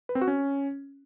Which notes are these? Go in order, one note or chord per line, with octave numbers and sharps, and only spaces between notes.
B4
C4
F#4
C#4